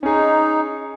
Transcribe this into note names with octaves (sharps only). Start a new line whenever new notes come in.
C#4 D#4 G#4